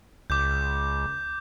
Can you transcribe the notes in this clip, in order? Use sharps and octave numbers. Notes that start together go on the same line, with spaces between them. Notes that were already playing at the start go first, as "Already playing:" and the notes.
C#2 D6 G6